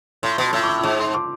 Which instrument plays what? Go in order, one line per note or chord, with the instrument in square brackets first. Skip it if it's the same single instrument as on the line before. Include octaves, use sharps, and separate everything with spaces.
[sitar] A2 [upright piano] C6
[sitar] B2 [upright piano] C6
[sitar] A2 [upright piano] E6
[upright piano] D6
E6
E6
[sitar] G#2 [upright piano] D6
[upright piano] C6
D6